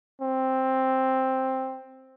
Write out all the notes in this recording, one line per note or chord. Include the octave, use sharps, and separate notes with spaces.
C4